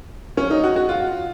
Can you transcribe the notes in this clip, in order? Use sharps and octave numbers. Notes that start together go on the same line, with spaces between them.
C#4
D#4
F#4
F#4
F4